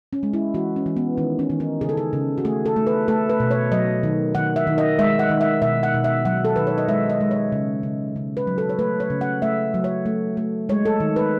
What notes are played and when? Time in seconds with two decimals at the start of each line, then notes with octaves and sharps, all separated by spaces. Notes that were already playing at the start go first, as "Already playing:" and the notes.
0.13 C#4
0.23 G#3
0.33 E4
0.54 E3 F#4
0.76 C#4
0.86 E3
0.97 B3
1.18 D#3 C#4
1.39 C#4
1.50 D#3
1.60 D#4
1.81 C#3 G#4
1.89 A4
1.97 G#4
2.13 C#3
2.38 F#4
2.45 A3 G#4
2.66 A4
2.76 A3
2.87 B4
3.08 A3 A4
3.30 B4
3.40 B2
3.51 C#5
3.72 F#3 D#5
4.03 D#3
4.35 D#3 F#5
4.56 E5
4.67 D#3
4.78 D#5
4.99 G#3 E5
5.19 F#5
5.30 D#3
5.41 E5
5.61 B2 E5
5.83 F#5
5.94 B2
6.04 E5
6.25 F#3 F#5
6.45 A4
6.56 D#3 B4
6.67 C#5
6.78 D#5
6.88 G#3 E5
7.10 D#5
7.21 G#3
7.31 C#5
7.52 C#3
7.83 C#3
8.16 C#3
8.37 B4
8.47 F#3
8.58 A4
8.69 C#5
8.79 A3 B4
9.00 C#5
9.10 C#3
9.21 F#5
9.42 A3 E5
9.74 F#3
9.84 C#5
10.06 A3
10.37 A3
10.69 G#3 C#5
10.85 A4
11.00 D#3
11.16 B4